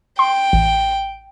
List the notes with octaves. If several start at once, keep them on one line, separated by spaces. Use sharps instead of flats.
G5 C6
A1